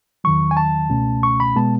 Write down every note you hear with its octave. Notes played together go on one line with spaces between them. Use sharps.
E2 D#3 F#3 C#6
G#5
A5
C#2 B2 A3 C#4
C#6
B5
B2 G#3 B3 A5